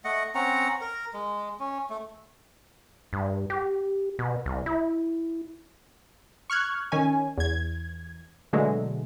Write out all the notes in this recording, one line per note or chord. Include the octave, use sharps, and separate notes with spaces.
A3 D#5 F#5
C4 C#4 F#5 A#5
A#4
G#3
C#4
A3
G2
G4
B2
C2
E4
C#6 F6 F#6 G#6
D#3 C#4 G#5
E2 G#6
B2 D3 F#3 G#3 A3